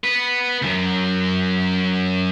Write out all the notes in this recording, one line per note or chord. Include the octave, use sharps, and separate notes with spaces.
B3 B4
C#2 F#2